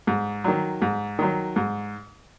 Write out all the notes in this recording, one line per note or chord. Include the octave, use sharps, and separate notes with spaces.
G#2
D#3 F#3
G#2
D#3 F#3
G#2